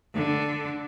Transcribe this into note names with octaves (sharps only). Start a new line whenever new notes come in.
D3